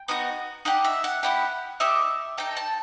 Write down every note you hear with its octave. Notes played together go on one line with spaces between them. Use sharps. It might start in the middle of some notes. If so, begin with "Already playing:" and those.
Already playing: G5
B3 D#4 F#4
D#4 G4 F#5
E5
F#5
B3 E4 G4 F#5
D#4 G4 E5
D#4 A4 G5
A5